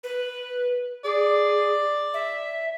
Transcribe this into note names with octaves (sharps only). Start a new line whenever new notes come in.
B4
G#4 D5
E5